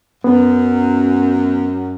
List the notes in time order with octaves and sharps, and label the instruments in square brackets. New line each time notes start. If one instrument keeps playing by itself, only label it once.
[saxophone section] F#2 [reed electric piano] B3